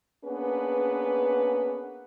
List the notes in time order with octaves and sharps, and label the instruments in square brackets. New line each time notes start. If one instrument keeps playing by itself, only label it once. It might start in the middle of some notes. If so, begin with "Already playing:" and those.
[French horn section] A#3 B3 C#4 D4 G#4 B4